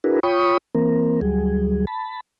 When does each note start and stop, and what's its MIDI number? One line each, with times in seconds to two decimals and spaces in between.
0.04 0.20 62
0.04 0.20 64
0.04 0.20 66
0.04 0.20 68
0.04 0.20 70
0.04 0.20 71
0.23 0.57 65
0.23 0.57 73
0.23 0.57 79
0.23 0.57 83
0.23 0.57 85
0.23 0.57 87
0.75 1.20 52
0.75 1.20 58
0.75 1.20 60
0.75 1.20 70
1.21 1.85 38
1.21 1.85 54
1.21 1.85 55
1.21 1.85 68
1.87 2.20 81
1.87 2.20 83